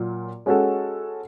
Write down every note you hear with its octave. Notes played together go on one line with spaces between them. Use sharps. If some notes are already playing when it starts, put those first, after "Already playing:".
Already playing: A#2 F#3 F4
G#3 C#4 F#4 A4